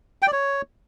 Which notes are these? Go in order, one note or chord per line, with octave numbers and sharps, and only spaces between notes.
G5
D5
C#5